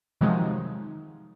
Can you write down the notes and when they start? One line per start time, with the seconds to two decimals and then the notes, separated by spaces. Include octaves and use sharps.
0.21 C3 D#3 F3 F#3 G#3 D#4